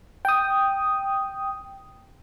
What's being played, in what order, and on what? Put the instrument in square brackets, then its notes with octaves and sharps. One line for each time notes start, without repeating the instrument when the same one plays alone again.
[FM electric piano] G5 D#6